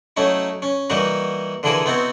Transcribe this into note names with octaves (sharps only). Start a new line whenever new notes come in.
F#3 A3 C#4 D#4 E4
C#4
E3 G3 A#3 D#4 F#4
D3 E3 F3 E4 G#4 A#4
B3 C4 D#4 E4 F#4